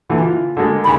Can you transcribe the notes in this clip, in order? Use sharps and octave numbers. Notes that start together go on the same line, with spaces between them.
A#2 D3 E3
F4
D3 G#3 A#3
D#2 C#3 B5